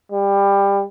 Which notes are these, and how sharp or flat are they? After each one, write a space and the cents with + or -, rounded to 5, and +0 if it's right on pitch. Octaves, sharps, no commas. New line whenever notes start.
G3 +20